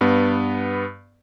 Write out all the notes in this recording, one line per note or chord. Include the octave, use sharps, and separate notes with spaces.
G2 B3